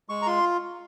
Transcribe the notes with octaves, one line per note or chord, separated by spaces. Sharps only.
G#3 C#6
A#5
F4 C6